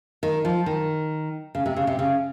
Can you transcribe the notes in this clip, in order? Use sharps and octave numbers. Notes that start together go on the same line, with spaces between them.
D#3
F3
D#3
C#3
C3
C#3
C3
C#3